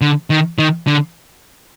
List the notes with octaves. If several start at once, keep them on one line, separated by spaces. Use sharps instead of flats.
D3
D#3
D#3
D3